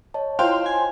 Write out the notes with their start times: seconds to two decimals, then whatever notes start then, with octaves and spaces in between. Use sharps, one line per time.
0.14 C#5 D#5 A5
0.39 E4 F4 C5 F5 G5 C6 F#6
0.66 G#5